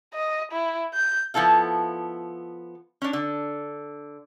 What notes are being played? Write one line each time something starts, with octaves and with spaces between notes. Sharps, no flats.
D#5
E4
G6
F3 B3 E4 A4 F5
C#4 D4
D3